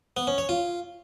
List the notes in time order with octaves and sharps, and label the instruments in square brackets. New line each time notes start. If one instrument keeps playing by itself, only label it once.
[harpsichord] B3
C#4
C#5
F4